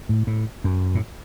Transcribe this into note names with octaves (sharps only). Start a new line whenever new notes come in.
A2
A2
F#2
A2